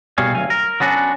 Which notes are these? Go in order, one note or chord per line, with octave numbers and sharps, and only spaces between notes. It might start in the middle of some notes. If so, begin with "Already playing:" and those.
C2 B2 G3 G#4 C#5 F5
D2 F#3 F5 G#5
A#4
F#3 B3 C#4 D4 F#4